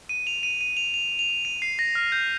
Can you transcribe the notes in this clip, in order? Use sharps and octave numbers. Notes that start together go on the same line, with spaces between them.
D#7
F7
D#7
D#7
F7
F7
F7
D#7
C7
A#6
F6
G6